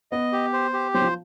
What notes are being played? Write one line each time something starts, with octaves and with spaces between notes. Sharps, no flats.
B3 D#5
G4
C5
G4
F#3 C5
F3